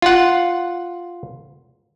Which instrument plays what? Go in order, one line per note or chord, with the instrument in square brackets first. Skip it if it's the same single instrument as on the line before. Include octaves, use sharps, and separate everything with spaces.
[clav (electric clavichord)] F4 F#5